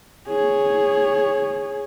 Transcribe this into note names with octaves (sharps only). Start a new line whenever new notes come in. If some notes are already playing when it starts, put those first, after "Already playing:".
G#4 C#5